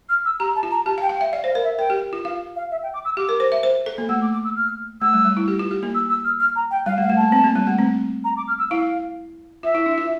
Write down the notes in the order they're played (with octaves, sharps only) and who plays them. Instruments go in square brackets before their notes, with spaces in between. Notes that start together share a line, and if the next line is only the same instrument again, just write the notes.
[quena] F6
E6
[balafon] G4 [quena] A#5
[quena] A5
[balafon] F4
[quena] A#5
[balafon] G4 [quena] A5
[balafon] F5
[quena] G5
[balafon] F5
[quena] G5
[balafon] E5
[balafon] D5 [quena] F5
[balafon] C5
[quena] F5
[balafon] A#4
[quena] E5
[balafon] A#4 [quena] G5
[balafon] G4
F4
[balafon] F4 [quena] F5
[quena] F5
E5
G5
D6
E6
[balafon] G4 [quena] D6
[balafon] A#4
C5
E5
C5
A4
A#3
[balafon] A3 [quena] E6
[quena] D6
D6
E6
F6
[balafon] A3 [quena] E6
[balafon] G3
G3
E4
G4
F4
G4
A#3
[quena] E6
E6
F6
F6
A#5
G5
[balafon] G3 [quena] F5
[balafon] A3
[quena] F5
[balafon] A3
[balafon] A#3 [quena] A5
[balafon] C4
A#3
G3
A3
C4
[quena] A#5
D6
F6
E6
[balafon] E4 [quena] F5
[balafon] F4 [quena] E5
[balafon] E4
D4
F4